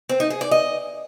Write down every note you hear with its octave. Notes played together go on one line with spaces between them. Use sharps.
C4
D#4
G#4
D5
D#5